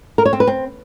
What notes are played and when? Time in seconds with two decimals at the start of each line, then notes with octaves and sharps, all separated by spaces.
0.18 A#4
0.25 C#5
0.33 C4
0.40 B4
0.47 C4